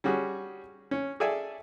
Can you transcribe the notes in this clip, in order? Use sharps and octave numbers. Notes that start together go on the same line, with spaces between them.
G3 C#4 F#4 G#4
C#4
G#4 A4 D5 E5 G#5